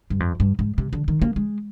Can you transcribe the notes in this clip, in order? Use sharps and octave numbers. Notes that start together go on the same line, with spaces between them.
G2
F2
G2
G#2
C3
D3
D#3
A#3
G#3